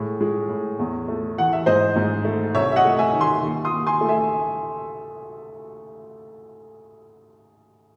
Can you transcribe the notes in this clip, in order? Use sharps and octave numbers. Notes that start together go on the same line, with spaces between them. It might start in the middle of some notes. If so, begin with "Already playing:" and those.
Already playing: A2 G#3
G#3
A2
E2
A3
E3 F#5
E5
G#2 C5 D#5
G#2
A3
C2 C#5 E5
E5
D#5 F#5
A3
E5 G#5
D#3
G#5 C6
D#2
C6 D#6
D#2
G#5 C6
A3
E5 G#5